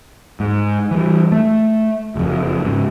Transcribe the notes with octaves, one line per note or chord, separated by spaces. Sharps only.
G#2
E3 G3
A3
F#1 F2
G#2 C#3